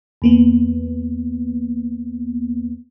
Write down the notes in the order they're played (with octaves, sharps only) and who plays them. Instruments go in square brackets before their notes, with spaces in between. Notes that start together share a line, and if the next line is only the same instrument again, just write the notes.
[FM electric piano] E2 A#3 B3